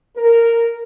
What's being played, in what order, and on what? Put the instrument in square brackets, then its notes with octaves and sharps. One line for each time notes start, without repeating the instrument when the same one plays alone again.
[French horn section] A#4